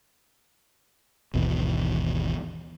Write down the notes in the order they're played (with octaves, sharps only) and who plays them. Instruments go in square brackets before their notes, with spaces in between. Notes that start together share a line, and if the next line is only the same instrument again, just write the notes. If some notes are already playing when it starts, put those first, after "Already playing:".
[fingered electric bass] G#1 D#2 B2 E3